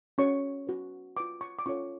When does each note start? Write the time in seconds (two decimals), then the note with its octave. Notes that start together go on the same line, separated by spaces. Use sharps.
0.18 C#4 F#4 C#5 C#6
0.67 F#4 B4
1.17 F4 B4 D6
1.41 C#6
1.59 D6
1.66 C#4 F4 A4 C#5 C#6